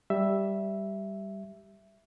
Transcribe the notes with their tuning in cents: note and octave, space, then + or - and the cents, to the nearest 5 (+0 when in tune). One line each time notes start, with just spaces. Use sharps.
G3 +0 E5 +5